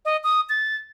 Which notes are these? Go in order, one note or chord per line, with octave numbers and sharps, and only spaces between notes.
D#5
D#6
A6